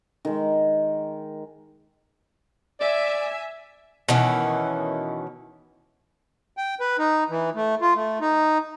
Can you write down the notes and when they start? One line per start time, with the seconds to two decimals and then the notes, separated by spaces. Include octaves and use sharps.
0.25 D#3 G#3
2.80 D5 E5 G#5
4.08 B2 D#3 E3 C#4
6.57 G5
6.80 B4
6.99 D#4
7.30 E3
7.55 A3
7.82 F4
7.96 A3
8.21 D#4